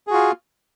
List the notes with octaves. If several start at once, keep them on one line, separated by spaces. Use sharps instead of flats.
F4 F#4 G#4